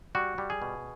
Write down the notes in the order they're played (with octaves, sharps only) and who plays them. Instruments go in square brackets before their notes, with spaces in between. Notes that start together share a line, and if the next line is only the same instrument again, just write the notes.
[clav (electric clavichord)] G3 F#4
G3
G#4
B2